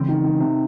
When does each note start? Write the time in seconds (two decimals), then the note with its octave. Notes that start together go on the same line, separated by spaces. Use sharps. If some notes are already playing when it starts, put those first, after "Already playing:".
Already playing: C#3 E3 G#3 C4
0.08 D#3
0.24 D#3
0.40 C3